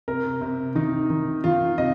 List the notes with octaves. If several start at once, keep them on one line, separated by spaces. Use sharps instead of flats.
C3 A#4
C3
D#3 D#4
D#3
D#3 F4
C3 D#5